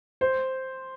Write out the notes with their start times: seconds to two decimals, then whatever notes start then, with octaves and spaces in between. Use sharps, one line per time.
0.21 C5